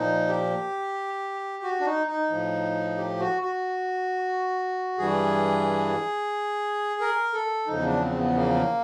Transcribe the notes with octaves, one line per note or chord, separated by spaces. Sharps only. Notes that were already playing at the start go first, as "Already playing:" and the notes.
Already playing: A#2 F3 D#4
G4
F#4
D4
D#4
D#4
A2 F3
G4
F#4
F#4
G2 E3 G3 G#4
A#4
A4
E2 C#3 F3 D#4
D4
C4
B3
A#3